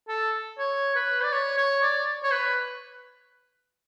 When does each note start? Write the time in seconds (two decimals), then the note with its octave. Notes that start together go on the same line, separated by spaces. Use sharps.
0.08 A4
0.59 C#5
0.96 B4
1.23 D5
1.33 C#5
1.57 C#5
1.82 D5
2.23 C#5
2.31 B4